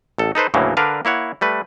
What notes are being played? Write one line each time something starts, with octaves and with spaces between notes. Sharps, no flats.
A1 A4
D#4 A4 B4 C5
D2 A2 C#3 E3 F#3 A#3
D3 D4 A#4 B4 F5
A#3 E4 C#5 F#5
G3 A3 B4